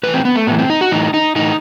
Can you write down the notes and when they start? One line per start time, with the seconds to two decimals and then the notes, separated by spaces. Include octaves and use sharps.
0.03 A2 E3 B4
0.14 C4
0.25 B3
0.36 A3
0.47 A2 E3 B3
0.58 C4
0.70 D#4
0.81 F#4
0.91 A2 E3 D#4
1.14 D#4
1.36 A2 E3 D#4